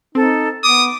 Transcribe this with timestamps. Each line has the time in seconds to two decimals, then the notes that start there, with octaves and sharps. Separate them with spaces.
0.15 C4 D#4 A4
0.63 B3 D6 D#6